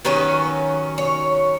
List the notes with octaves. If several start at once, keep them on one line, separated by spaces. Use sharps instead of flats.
D#3 F#3 C#4 B4
C#5